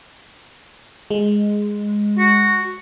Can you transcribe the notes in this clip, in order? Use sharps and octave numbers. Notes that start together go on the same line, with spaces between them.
G#3
F#4